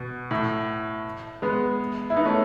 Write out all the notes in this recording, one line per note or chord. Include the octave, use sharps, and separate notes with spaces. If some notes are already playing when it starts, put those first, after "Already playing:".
Already playing: B2
A2
G#3 B3
E4
B3 D#4
A3 C#4